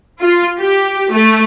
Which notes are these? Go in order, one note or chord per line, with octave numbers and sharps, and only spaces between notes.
F4
G4
A3